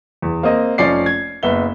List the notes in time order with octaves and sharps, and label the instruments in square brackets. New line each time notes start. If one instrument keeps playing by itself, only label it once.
[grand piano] E2
A#3 C4 D#5
F1 F3 C#4 D5 C7
G#6
F#1 B3 E5 G7